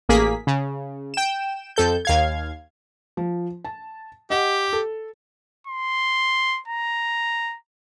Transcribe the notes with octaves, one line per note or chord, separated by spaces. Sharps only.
A1 A#3 G#4 B6
C#3
G5 E7
F2 A4 G6
D#2 F5 G#6
F3
A5
G4 D#5 F#5
A4
C6
A#5